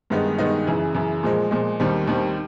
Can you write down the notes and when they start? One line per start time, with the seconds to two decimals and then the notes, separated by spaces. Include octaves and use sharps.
0.10 G2 D#3 G#3 B3 D#4
0.38 G2 D#3 G#3 B3 D#4
0.67 F#2 C#3 E3
0.95 F#2 C#3 E3
1.23 A#2 F3 G#3
1.51 A#2 F3 G#3
1.80 D#2 D#3 G3 C4
2.07 D#2 D#3 G3 C4